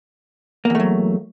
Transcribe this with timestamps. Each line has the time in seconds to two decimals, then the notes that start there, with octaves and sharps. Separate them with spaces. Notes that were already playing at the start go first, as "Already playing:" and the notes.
0.65 A#3
0.70 E2
0.75 A3
0.80 F#3